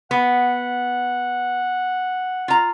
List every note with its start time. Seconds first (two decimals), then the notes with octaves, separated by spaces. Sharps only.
0.11 B3 F#5
2.48 F4 A#5